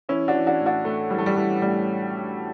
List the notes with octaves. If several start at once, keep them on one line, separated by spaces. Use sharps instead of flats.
E3 C#4 E4
D4 F#4
E3
D4 F#4
A2
D4 F#4
A2 A3
E3 G3
A3
G3
E3 A3
A2 G3